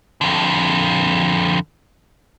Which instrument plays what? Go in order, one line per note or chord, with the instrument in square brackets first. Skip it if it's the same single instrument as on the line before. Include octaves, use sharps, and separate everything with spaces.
[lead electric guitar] F2 D3